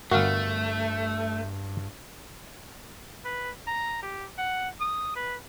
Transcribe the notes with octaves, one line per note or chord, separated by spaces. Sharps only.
G1 G2 A3 F#4 A#4 F5 F6
B4
A#5
G4
F#5
D#6
B4